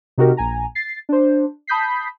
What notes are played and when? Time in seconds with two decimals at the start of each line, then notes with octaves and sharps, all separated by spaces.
0.18 C3 D#4 F#4 G4 A#4
0.37 A#1 G#5 A#5
0.75 A6 C7
1.09 D4 C5
1.67 A5 B5 D#6 G6 B6 C7